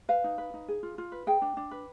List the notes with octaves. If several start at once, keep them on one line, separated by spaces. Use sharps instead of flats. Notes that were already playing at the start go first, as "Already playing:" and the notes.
B4 F5
D#4
B4
D#4
G#4
F4
F4
B4
G#4 G5
D4
D4
B4